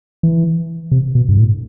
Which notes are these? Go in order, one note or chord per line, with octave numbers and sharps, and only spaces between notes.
E3
C3
B2
G2
A2